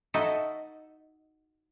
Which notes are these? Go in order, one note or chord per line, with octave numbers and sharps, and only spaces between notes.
D#4 E4 F#4 A4 D#5